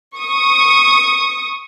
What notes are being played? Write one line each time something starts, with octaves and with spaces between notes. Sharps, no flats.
C#6 D#6